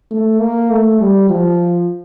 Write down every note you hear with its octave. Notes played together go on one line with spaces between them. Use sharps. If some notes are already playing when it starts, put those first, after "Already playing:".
A3
A#3
A3
G3
F3